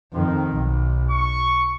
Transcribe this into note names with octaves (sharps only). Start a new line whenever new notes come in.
F2 D#3
B1
C#6